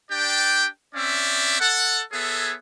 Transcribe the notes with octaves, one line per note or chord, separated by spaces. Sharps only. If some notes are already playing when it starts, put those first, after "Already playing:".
D4 G4 D5 G5
C4 C#4 D5 E5
A4 F#5
B3 G#4 A4 C#5 E5